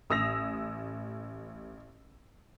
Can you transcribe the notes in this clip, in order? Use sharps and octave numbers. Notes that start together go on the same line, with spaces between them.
A1 D#6 E6 A#6 F7